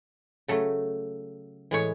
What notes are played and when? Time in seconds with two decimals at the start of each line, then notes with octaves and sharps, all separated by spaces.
0.48 C#3 F#3 A3 A4
1.71 A2 E3 G#3 C#5